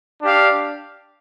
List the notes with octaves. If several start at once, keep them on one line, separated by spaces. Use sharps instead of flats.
D4 G4 F5